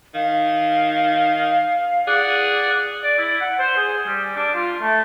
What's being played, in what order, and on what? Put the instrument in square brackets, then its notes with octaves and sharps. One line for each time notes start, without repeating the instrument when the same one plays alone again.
[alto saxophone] D#3 [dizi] F5
[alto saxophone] G#4 [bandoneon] D5 F#5 F#6
[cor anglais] D5
E4
F#5
C5
G#4
G3
D4
F4
A3